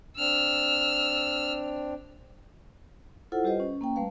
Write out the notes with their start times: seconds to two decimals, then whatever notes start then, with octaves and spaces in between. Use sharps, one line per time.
0.18 C4 D4 E6 F6
3.32 E4 F4 A4 C5 F#5
3.44 G3 F4 G4 B4 C5 D#5
3.60 C#4
3.81 A#3 C#4 G5
3.96 G3 A3 B4 F5